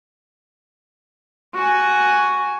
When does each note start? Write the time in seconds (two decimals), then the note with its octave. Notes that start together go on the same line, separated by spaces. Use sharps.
1.55 F#4 G#5